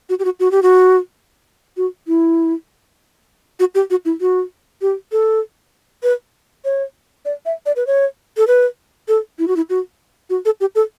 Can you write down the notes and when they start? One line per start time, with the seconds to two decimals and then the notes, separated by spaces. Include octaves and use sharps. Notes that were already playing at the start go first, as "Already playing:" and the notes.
0.09 F#4
0.19 G4
0.25 F#4
0.40 F#4
0.51 G4
0.62 F#4
1.77 F#4
2.07 E4
3.60 F#4
3.75 G4
3.90 F#4
4.05 E4
4.21 F#4
4.82 G4
5.12 A4
6.03 B4
6.65 C#5
7.25 D5
7.46 E5
7.66 D5
7.76 B4
7.87 C#5
8.37 A4
8.47 B4
9.08 A4
9.39 E4
9.48 F#4
9.56 E4
9.70 F#4
10.30 F#4
10.45 A4
10.60 G4
10.75 A4